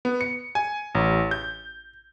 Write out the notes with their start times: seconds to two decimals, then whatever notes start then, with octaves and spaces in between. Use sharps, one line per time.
0.05 B3
0.21 C#7
0.55 G#5
0.95 A1
1.31 G6